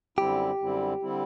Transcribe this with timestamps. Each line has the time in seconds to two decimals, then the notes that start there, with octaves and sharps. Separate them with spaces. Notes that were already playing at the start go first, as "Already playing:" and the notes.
0.18 F#2 D3 G3 C4 E4 G4
0.59 F#2 D3 G3 C4 E4
1.02 D3 G3 C4 E4